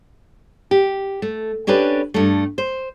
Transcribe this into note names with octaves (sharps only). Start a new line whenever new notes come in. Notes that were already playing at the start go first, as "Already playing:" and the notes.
G4
A3
C#4 D4 G4 A4 B4
G2 A3
C5